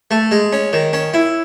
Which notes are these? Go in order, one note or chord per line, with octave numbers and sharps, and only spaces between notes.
A3
G#3
C#4
D#3
C#4
E4